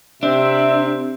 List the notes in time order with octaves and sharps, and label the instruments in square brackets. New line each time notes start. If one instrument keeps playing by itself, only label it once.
[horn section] C3 C4 [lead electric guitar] D4 [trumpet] E5